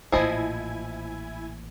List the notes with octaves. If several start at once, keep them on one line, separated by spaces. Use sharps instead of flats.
A1 A#2 F3 E4 D#5 G#5 G#6